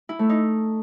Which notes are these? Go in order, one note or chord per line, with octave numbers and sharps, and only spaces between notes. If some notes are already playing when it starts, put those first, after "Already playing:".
E4
A3
D#4